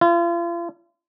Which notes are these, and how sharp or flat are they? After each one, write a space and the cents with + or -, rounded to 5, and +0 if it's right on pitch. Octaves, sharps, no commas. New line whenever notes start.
F4 -40